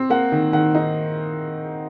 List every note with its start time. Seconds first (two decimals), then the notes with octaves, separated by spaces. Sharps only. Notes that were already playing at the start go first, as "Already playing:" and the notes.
Already playing: C4
0.10 A#3 F#5
0.32 D#3
0.53 D#3 F#5
0.75 D#4